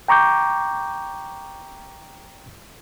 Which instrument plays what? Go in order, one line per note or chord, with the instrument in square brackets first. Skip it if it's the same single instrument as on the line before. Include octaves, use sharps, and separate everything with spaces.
[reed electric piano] G5 A#5 C#6 D6 G6